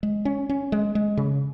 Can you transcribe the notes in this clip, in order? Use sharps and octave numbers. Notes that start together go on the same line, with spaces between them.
G#3
C#4
C#4
G#3
G#3
C#3